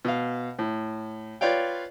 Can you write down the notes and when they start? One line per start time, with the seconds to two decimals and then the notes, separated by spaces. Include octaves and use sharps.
0.05 B2 F5
0.59 A2
1.41 F4 B4 C#5 D5 F5 G5